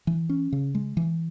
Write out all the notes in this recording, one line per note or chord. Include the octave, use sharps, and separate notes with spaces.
E3
C#4
C#3
G#3
E3